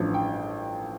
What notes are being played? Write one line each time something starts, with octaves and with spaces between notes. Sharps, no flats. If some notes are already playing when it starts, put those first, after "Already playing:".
Already playing: A1 G2 F3
G5